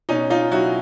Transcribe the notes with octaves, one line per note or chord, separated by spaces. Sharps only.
B2 C#4 D#4
D#4 F4
F#3 E4 F#4